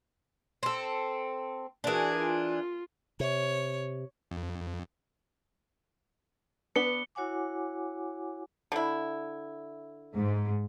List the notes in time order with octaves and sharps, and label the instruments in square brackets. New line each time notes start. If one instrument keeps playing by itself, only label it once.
[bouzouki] C4 A4
[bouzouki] E3 D4 [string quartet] F#4 G#4 A#4
[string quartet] F4
[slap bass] C3 [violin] C#5
[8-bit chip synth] F2
[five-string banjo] B3 D4 B4 [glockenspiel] C#7 G7
[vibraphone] E4 F#4 C#5 F#5 G#5 D6
[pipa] D3 E4
[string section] G#2